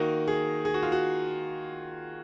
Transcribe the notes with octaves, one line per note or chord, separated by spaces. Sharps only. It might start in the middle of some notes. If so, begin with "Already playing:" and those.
Already playing: D#3 A#3 D#4 F#4
G#4
G#4
F#4
F4
F#4